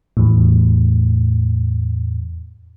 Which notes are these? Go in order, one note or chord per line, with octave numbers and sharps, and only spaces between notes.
E2 A2